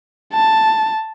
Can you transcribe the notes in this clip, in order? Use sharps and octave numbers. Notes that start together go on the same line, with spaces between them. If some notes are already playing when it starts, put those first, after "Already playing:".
A5